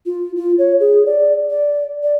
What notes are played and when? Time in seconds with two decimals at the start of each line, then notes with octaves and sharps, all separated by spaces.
0.06 F4
0.36 F4
0.58 C#5
0.80 G#4
1.06 D5
1.50 D5
2.03 D5